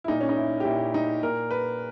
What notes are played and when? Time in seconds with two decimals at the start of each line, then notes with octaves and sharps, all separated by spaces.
0.04 E4
0.08 A#2 D#4
0.21 C#4
0.29 D#4
0.36 E4
0.60 G4
0.65 A#2 E4
0.94 D#4
1.23 A#2 A#4
1.51 B4